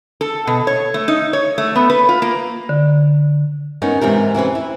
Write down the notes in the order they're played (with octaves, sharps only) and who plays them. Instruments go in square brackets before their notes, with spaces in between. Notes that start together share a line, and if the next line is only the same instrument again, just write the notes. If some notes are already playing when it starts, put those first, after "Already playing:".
[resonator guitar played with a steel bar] A4
B2
C#5
A3
D#4
C#5
A3
B3
B4
F4
A#3
[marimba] D3
[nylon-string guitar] B3 C#4 D#4 A#4
G#2 C3 E3 A#4
E3 C4 C#4 B4
E4